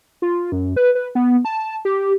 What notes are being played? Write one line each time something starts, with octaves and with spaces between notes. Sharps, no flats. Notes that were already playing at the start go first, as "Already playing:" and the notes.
F4
F#2
B4
B4
B3
A5
G4